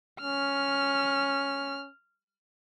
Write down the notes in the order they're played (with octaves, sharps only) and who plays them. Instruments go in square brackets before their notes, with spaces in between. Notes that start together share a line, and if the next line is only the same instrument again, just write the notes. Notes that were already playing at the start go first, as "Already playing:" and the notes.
[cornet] C#4 [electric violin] F6